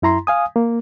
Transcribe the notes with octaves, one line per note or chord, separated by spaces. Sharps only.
F#2 E4 A#5 C6
F5 G#5 D#6
A#3